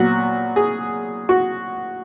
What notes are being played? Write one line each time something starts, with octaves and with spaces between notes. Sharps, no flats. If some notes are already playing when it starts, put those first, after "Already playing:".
Already playing: A#2 F#3 B3 F#4
G#4
F#4